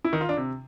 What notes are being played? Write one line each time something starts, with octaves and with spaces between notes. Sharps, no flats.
E4
D#3
F4
D4
C3